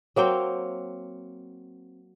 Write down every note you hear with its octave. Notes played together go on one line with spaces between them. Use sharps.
F#3 A#3 C4 G5